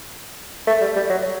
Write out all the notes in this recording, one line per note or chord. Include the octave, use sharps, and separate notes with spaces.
A3
G3
G3
F#3